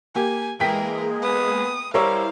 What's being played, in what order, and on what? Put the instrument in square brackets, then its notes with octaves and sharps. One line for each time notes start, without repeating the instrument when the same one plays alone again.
[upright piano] A#3 G4 [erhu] G#5
[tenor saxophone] E3 [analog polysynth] G#3 A#3 G#4 [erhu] A#4 [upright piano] G5 B6
[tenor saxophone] B3 [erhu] D#6
[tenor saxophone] G3 [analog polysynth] E4 C5 [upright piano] A#4 C#5 E6 [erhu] F5